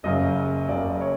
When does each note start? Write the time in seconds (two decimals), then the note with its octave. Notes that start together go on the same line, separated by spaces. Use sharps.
0.03 F#1 F#2 C#3 D#5
0.69 F#1 F#2 C#3 D5
1.01 C#5